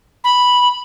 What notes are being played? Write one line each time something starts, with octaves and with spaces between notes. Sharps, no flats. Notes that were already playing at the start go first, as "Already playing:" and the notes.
B5